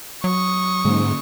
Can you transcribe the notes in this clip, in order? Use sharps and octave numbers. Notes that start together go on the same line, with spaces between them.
F#3 C#6 D#6
G#2 D3 A#3 C#4